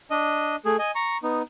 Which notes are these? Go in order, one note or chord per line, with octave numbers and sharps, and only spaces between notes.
D4 D#5
A3 G#4
D#5 G#5
A#5 C#6
B3 D#4